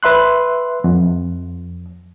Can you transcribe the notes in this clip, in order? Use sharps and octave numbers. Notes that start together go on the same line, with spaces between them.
B4 E5 C6 F#6
F2